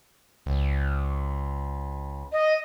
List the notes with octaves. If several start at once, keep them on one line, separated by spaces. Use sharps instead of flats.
C#2
D#5